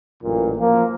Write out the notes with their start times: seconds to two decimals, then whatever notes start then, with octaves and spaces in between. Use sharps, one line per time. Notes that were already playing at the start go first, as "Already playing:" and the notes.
0.22 A1 F#2 A#2
0.57 F3 A#3